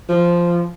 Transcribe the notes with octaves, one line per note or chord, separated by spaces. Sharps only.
F3